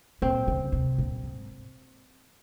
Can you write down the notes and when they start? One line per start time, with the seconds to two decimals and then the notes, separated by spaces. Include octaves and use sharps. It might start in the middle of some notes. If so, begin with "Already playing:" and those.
0.22 A#2 C4
0.48 C#3
0.72 C3
0.98 A#2
1.23 G#2